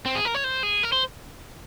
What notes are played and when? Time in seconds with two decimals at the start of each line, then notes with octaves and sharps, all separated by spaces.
0.06 C4
0.15 G#4
0.25 A#4
0.35 C#5
0.44 C5
0.63 G#4
0.83 A#4
0.93 C5